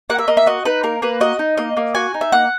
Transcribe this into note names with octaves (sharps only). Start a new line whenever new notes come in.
A#3 F#5
E5
A#3 D#5
E5
F#4 D#5
D#4 B4
A#3 A#4
A#3 B4
F#4 D#5
D#4
A#3 D#5
A#3
F#4 G#5
D#4
E5
A#3 F#5